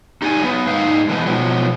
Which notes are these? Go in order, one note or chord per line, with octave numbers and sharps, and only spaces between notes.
D#4 G4 D5 G5 G#5
F#3 B3
G#2 D#4 F5
D3 E3 G#3 B3 D#4 B4
B2 F3 F#3